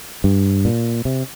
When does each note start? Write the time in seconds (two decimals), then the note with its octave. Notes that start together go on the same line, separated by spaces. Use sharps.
0.24 G2
0.65 A#2
1.05 C3